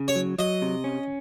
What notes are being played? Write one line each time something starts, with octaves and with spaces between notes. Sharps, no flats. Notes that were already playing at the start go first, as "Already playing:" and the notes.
Already playing: C#3
C#5
F#3
F#3 D#5
C3
C#4